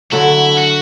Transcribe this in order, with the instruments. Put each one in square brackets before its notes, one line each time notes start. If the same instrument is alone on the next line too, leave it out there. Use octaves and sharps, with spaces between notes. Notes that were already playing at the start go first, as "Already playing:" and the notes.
[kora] D3 F#3 A3 [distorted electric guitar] E4
[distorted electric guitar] F#4